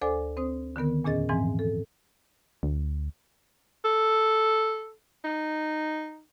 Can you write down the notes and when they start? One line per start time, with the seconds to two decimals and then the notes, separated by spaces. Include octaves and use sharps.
0.02 D2 A4 C5 D5 G#5 D6
0.37 C4 C5 D#6
0.76 D3 D#3 B3 A#4
1.04 E2 A#2 C#4 G#4 D#5 A6
1.29 G#2 E3 F3 C4 G#5
1.59 A4
2.63 D2
3.85 A4
5.24 D#4